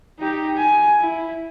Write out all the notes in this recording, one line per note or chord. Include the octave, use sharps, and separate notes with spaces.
D#4 G4
G#5
E4